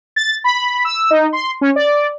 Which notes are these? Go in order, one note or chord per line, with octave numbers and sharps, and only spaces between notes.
A6
B5
E6
D#4
C6
C#4
D5